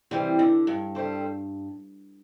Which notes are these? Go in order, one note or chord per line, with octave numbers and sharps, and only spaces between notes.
C3 E3 G3 C4
D3
G2
G3 C4 A4